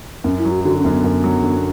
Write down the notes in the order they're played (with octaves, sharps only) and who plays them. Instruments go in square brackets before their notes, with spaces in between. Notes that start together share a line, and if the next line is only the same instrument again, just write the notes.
[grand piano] F#2 [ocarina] C#4
[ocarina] E4
[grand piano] F#3
[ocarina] F#4
[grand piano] D3 [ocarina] F#4
[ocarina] C#4
[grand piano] F#2
[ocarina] B3
[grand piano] F#2
F#3
D3